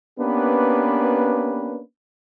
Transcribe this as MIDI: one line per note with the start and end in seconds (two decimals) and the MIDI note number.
0.20 1.81 58
0.20 1.81 59
0.20 1.81 61
0.20 1.81 62
0.20 1.81 67
0.20 1.81 71